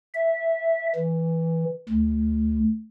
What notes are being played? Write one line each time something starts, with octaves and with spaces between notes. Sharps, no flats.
E5
E3
D2